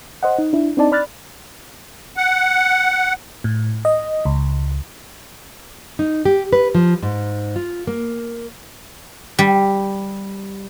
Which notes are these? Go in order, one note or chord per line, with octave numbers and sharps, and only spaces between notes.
C5 D#5 F#5
D#4
D4 E4
C4 D4 D#4 D5 A5
D5 B5 F6 F#6 A6
F#5
A2
D#5
C#2
D#4
G4
B4
F3
G#2
F4
A#3
G3